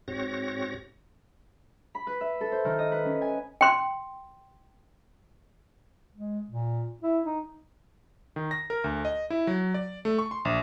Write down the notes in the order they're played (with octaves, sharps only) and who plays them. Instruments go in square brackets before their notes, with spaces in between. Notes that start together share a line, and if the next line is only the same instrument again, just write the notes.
[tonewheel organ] G#2 C4 F#4 C#5 A#6
[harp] B5
B4
E5
A4
C5
D#3
D#5
B4
C#4
G#5
[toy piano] G5 C6
[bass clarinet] G#3
A#2
E4
D#4
[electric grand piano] D#3
A#6
A#4
D2
D#5
E4
F#3
D5
A3
C#6
C6
A#1